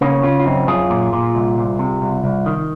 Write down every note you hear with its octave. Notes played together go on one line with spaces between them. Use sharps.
C#3 A#3 C#4
C#3 C#4 F4
F4
F#2 C4 D#4
F#2 F4 G#4
A#2
A#2
C2
C2
C3
C2
C2
D#3